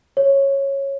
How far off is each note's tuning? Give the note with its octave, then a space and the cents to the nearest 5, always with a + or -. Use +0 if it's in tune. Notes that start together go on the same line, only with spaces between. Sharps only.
C#5 -10